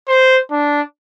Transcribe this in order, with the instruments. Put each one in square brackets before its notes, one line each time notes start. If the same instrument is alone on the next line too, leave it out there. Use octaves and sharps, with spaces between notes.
[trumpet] C5
D4